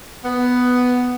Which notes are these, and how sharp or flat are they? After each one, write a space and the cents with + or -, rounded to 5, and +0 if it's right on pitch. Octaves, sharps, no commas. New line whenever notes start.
B3 +5